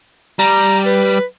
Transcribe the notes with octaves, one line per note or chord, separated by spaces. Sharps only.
G3 A#5
B4